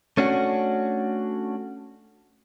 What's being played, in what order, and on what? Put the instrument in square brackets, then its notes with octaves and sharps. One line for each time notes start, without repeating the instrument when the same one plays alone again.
[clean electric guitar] A3 C#4 D4 F#4